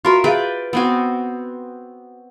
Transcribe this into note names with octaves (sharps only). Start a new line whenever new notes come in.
F4 F#4 A#4 E5 B5 C6
G#4 B4 D5 E5 F5 G5
B3 C4 F#4